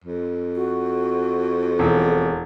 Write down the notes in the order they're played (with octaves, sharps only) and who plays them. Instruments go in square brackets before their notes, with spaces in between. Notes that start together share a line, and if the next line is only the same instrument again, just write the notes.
[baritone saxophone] F2
[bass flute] F#4
[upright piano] E1